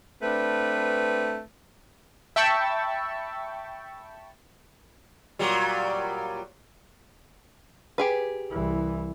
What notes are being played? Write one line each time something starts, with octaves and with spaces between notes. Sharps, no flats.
A3 C4 D4 B4
E5 G5 A5 B5 C#6 E6
A#2 F#3 G3
G4 G#4 B4
C2 E3